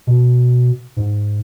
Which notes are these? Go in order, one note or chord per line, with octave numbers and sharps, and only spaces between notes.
B2
G#2